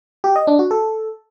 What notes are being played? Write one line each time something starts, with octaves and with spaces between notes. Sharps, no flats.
G4
D#5
D4
F#4
A4